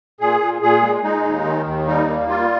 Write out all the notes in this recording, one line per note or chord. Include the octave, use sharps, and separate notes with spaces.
A#2 G#4
A#2
A#2 G#4
G#3
G#3 D#4
D#2
D#3
D#2
G3 D#4
A#3
G3 F4